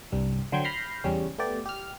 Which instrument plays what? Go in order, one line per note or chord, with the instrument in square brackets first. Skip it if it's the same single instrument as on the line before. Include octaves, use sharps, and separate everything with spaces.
[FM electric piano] C2 G2 G3
D3 F#3 C5 G5 G6 G#6
B5 F6 G6 A#6 C7
E2 C#3 G3 C#4
A3 B3 G4 D5
G4 F6